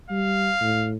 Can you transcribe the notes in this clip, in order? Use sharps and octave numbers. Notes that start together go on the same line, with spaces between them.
G3 F5
A2